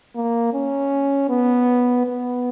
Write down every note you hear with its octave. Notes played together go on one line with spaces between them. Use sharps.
A#3
C#4
B3
B3